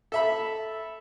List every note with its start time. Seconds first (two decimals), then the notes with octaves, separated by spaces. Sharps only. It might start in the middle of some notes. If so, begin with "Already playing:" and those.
0.12 A4 E5 B5